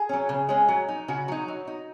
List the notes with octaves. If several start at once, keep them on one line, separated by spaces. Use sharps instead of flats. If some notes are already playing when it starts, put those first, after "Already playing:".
Already playing: G#4
F#3 C#4
C#3
G#3 C#4
F#3
D#4
C#3 F#4
F#3 D#4
F#3
D#4